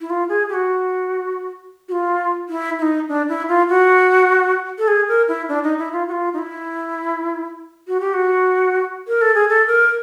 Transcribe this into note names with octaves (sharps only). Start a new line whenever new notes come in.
E4
F4
G#4
G4
F#4
F#4
F4
E4
E4
D#4
D4
E4
F4
F#4
A4
G#4
A#4
E4
D4
D#4
E4
F4
F#4
F4
D#4
E4
F#4
G4
F#4
A#4
A4
G#4
A4
A#4